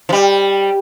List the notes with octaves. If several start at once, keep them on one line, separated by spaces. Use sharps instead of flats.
F3
G3